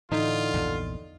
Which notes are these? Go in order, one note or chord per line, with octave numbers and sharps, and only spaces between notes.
A2 D3 E3 D#4 F4
A#1 E2 G2